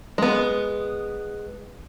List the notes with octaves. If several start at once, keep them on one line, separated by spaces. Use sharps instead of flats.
G#3 B3